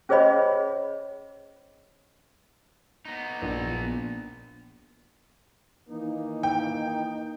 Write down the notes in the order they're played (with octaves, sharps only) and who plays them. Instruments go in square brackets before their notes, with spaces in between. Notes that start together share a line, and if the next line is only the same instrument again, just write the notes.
[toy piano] C#4 G#4 C5 C#5 D#5 B5
[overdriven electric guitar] B3 D#4
[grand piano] A#1
[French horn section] D#3 E3 A#3 [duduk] D#4
[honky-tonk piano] G5